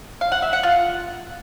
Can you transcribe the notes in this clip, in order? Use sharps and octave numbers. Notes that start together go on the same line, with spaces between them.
F5
F#5
E5
F#5
F4